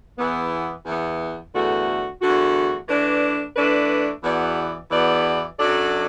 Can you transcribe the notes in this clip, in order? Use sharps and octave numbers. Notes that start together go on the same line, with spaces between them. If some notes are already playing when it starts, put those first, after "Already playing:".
E2 E3 B3
E2 E3 B3
E2 D3 A3 F#4
E2 D3 A3 F#4
E3 A3 D4 B4 D5
E3 A3 D4 B4 D5
E2 E3 B3 F#4 D5
E2 E3 B3 F#4 D5
F#2 F#3 D4 A4 D5